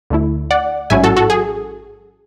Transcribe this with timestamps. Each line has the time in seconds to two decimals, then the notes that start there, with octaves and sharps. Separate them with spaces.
0.10 D2 D3 A3 E4
0.51 D5 F#5
0.90 A1 G#2 F#3 C#4 E4 E5 G#5
1.04 F#4 A4
1.17 F#4 A4
1.30 G#4